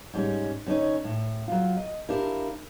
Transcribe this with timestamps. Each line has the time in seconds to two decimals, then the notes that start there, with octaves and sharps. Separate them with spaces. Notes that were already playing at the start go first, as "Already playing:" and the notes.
0.14 G#2 G3 C#4
0.66 D3 C4 C#4 D#4 C#5
1.04 A2
1.48 F#3 F4
1.77 D#5
2.09 D4 E4 F4 G4 A#4